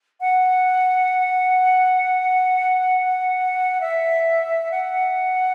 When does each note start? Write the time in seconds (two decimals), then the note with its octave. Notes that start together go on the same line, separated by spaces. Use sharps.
0.20 F#5
3.80 E5
4.71 F#5